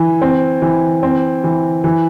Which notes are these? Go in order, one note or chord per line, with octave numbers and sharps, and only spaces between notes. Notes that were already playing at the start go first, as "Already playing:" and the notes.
Already playing: E3
C4
E3
C4
E3
E3